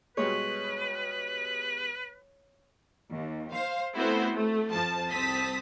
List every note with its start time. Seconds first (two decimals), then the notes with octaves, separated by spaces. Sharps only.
0.17 B2 G3 G#3 B4 C#5
3.11 D#2
3.50 C5 F5
3.96 A3 B3 C4 E4 F#4 C5
4.33 A3
4.71 F2 F3 A5
5.11 C2 C4 A5 D#6 B6